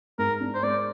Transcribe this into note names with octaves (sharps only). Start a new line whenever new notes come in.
G#2 A#4
D4
C5
G#3 D5